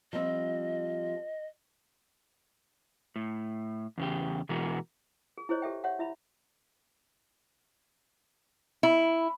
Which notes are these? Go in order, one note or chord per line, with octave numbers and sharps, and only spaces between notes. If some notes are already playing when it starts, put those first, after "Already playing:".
F3 G3 C4 D#5
A2
E2 C#3 G4
B2 E3 G#3 F#4 A#4
G#4
E4 G#4 C5 C#5 D#5
G4 A4 E5 G5
G4 C#5 E5 F#5
E4 E5 B5
E4